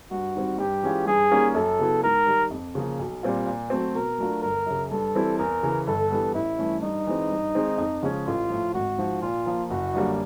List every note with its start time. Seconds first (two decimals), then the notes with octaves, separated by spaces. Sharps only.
0.11 G2 F#4
0.35 D#3 G3 C4
0.58 G2 G4
0.83 E3 G#3 C#4 F4
1.06 G2 G#4
1.31 D#3 G3 A#3 C#4
1.54 F#2 A4
1.79 C#3 F#3 B3 E4
2.03 G#2 A#4
2.27 D#3 G3
2.51 F2
2.75 C#3 F3 A#3
2.99 B1
3.23 A#2 G3 C4 F4
3.46 A#2
3.70 F#3 A3 C4
3.95 B2 A#4
4.18 F#3 A3 D4 F4
4.42 G1 A#4
4.67 F#2 C#3
4.91 G2 A4
5.15 E3 G3 C4 E4
5.38 E2 A#4
5.63 C#3 E3
5.87 G1 A4
6.10 G2 E3 G3 B3
6.35 A1 E4
6.59 G2 E3 A3 C#4
6.83 G2 D#4
7.07 E3 G#3 C4
7.31 G2
7.55 D#3 G#3 C4
7.78 F2
8.03 C#3 F3 G#3 C#4
8.26 A1 F4
8.50 A2 F3
8.74 G#1 F#4
8.98 G#2 F3
9.22 A#2 F4
9.46 F3 A#3
9.70 F#1 F#4
9.94 F#2 D3 G3 A#3